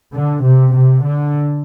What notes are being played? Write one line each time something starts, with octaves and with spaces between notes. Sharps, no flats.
D3
C3
C3
D3